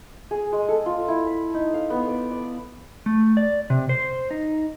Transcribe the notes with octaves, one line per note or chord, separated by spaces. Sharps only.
G#4
G#3
A4
F4
E4
B5
D#4
F5
B3
D5
D5
A3
D5
C3
C5
D#4